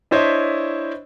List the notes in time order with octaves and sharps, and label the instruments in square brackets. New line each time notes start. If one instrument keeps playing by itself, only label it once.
[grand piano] D4 E4 C5 C#5 D#5 E5